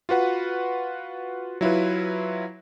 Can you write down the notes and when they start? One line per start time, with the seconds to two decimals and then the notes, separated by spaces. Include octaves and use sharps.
0.09 F4 F#4 B4 F#5
1.61 F#3 E4 F4 B4